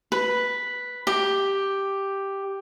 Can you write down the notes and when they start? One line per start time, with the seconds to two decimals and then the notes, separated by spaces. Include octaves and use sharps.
0.12 B4
1.07 G4